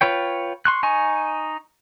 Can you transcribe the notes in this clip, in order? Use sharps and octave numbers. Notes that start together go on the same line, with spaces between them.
F4 B4 C#5 G5
C6 C#6 F#6
D#4 G#5 C#6